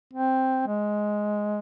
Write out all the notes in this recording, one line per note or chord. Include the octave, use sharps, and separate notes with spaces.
C4
G#3